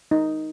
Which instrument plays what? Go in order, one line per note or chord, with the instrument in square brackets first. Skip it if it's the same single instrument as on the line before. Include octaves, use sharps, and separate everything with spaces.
[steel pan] D#4